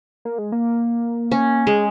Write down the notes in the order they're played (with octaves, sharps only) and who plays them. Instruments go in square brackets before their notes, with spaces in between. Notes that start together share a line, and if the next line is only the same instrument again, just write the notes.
[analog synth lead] A#3
G#3
A#3
[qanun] C#4
[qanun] G#3 [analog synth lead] G#4